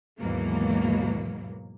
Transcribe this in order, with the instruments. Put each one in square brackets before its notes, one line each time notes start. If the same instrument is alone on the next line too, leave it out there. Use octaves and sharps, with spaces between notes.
[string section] D#2 G#2 B2 E3 F#3 A#3